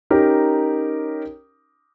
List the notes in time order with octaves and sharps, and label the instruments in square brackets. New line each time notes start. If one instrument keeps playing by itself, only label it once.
[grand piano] C#4 D#4 G4 A#4